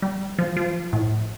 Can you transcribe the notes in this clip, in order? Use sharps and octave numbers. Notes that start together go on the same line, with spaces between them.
G3
F3
F3
A2